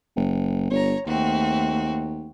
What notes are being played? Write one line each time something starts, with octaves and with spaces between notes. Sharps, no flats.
F#1
G1 C#5 A#5
D#2 A3 C4 F#4